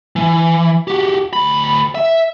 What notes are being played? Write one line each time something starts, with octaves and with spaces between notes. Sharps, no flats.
E3
F#4 G4
D2 B5
E5